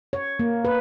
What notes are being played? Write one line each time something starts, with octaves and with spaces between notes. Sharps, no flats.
C#5
A#3
B4